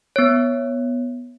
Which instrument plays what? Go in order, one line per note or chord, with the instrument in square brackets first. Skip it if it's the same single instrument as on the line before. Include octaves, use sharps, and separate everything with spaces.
[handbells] B3 C#5